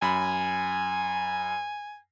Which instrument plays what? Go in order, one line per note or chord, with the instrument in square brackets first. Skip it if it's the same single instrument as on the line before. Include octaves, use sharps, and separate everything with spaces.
[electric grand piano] F#2 B5 [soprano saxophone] G#5